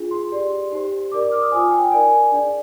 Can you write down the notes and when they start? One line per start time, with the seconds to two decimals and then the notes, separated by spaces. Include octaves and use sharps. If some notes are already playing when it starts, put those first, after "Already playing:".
Already playing: D4 F4 G#4
0.11 C6
0.31 G4 D5
0.71 D#4 G4 C5
1.11 D#4 A#4 D5 D6
1.21 D6
1.32 F6
1.41 D#6
1.52 F4 C5 G#5
1.72 G5
1.91 D#4 A#4 D5 G#5
2.32 D4 G#4 D5